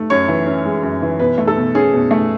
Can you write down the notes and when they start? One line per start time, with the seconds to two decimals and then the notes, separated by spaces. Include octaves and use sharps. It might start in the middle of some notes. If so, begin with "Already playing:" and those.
Already playing: A3
0.10 F#2 C#5
0.28 E3
0.46 C#4
0.65 G#3
0.83 F#2
1.02 E3
1.19 B2 B4
1.38 A3
1.47 A4
1.57 B2
1.75 C#4 G#4
1.93 B2
2.11 A3